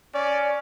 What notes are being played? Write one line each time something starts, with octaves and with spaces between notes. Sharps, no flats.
C#4 D5